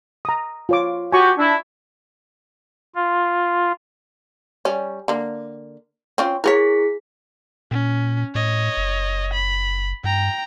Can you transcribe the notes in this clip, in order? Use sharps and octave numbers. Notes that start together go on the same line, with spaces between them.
A#5 D#6
F4 C#5 D6
F#4 G4 G#5 C#6
D4 E4
F4
G3 C#4
D3 A#3
C4 C#4 F4
E4 G#4 A#4 B4 C#5 B6
A#2 C#4
A2 C#5 D#5
F#1
B5
G2 G5 A#5